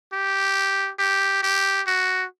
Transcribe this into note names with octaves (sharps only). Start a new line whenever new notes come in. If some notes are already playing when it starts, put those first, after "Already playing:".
G4
G4
G4
F#4